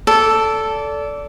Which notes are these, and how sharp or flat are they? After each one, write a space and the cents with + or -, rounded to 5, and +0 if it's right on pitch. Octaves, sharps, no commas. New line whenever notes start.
A4 +0 D5 -20 G5 +0